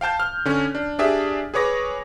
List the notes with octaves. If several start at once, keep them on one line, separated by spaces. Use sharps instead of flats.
F5 G5 A5 G6
F6
D3 C#4
D4
D4 G4 G#4 D5 E5
G#4 B4 C#5 D6 A#6